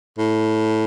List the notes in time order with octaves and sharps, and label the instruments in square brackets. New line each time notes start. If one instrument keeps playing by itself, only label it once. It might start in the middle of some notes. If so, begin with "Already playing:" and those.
[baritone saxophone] A2